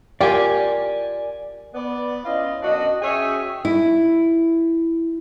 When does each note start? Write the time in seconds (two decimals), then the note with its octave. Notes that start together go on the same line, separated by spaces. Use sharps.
0.21 F4 G4 A#4 D5 F5 G#5
1.74 B3 D5
2.25 C#4 E4 F4 D#5
2.62 F#2 B2 D4 F#4 D#5
3.02 C#4 F#4 G#4 C#5 E5 G5
3.65 E4